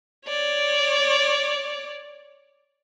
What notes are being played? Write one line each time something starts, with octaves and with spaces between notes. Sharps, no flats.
C#5 D5